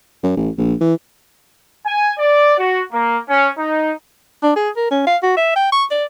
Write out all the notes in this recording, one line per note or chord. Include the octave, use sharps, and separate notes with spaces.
F#2
A1
A#1
E3
G#5
D5
F#4
A#3
C#4
D#4
D4
G#4
A#4
C#4
F5
F#4
E5
G5
C#6
D5